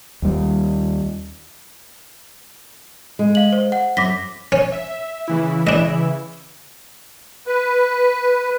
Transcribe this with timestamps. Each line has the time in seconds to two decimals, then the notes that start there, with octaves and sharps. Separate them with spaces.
0.22 D#2 G3
3.19 G#3
3.35 F5 F#7
3.53 C5
3.72 F#5
3.97 F#2 D6 A#6 B6
4.52 C#4
4.72 E5
5.28 C#3 E3 E4
5.67 D4 D#5
7.47 B4